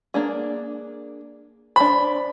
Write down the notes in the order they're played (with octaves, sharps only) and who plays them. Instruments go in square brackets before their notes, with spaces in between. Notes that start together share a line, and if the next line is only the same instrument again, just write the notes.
[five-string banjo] A#3 D4 G#4
[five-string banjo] D4 C5 [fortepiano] B5